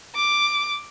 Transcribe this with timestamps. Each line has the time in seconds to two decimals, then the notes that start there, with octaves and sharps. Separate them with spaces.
0.16 D6